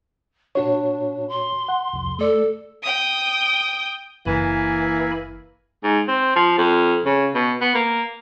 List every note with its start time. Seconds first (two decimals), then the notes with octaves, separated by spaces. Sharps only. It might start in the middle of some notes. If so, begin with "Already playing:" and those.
0.55 A#2 D4 F#4 C#5
1.29 C6
1.69 F#5
1.93 C2 F2
2.19 A3 A4 D5
2.82 G5 D#6
4.27 F#1 E3 A#3 G#5 B5
5.84 G#2
6.08 C4
6.36 F3
6.58 F2
7.05 C#3
7.34 B2
7.61 B3
7.74 A#3